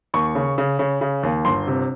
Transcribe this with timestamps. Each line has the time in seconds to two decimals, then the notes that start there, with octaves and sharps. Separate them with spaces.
0.14 D#2 C#6
0.35 C#3
0.58 C#3
0.79 C#3
1.01 C#3
1.23 D#2
1.45 G1 C6
1.67 C3